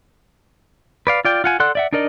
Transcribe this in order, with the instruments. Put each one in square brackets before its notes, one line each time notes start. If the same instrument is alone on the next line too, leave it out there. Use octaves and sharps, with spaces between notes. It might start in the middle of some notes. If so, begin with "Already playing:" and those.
[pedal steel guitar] B4 D5 F5
F4 D5 G5
F4 F#5 G#5
A4 D5 F#5 C6 F#6
D5 E5 F#5
D4 D#4 A#4 D5 D#5